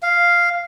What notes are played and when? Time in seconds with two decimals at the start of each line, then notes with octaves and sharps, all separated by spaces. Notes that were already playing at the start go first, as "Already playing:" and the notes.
0.03 F5